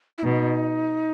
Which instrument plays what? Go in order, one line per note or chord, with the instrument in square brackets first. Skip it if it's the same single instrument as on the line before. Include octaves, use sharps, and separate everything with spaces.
[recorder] E4
[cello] B2 [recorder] D#4